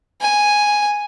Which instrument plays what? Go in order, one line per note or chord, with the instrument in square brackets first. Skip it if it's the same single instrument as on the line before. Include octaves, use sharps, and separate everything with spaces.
[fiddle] G#5